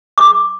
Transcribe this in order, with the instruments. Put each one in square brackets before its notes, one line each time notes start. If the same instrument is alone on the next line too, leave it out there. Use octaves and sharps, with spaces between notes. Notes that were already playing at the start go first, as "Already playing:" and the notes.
[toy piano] D6